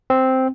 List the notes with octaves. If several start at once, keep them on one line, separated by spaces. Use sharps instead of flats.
C4